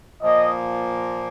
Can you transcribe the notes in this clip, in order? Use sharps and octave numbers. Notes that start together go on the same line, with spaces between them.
A#2 F3 A#3 D#5